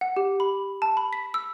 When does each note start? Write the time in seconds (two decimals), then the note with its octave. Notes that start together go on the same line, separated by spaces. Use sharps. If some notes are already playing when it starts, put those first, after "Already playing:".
0.01 F#5
0.17 G4
0.40 B5
0.82 A5
0.97 B5
1.13 B6
1.34 E6